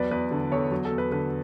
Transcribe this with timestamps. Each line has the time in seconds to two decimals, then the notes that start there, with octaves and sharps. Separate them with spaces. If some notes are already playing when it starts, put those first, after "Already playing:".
Already playing: E2 F#3 B4 D5
0.11 E2 B4
0.31 D3
0.52 E2 A4 C#5
0.71 F#3
0.85 A4
0.92 E2
0.98 B4
1.12 D3 B4